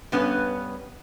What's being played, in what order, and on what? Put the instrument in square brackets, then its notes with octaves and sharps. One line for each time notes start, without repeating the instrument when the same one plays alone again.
[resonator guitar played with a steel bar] G2 B3 C#4 B4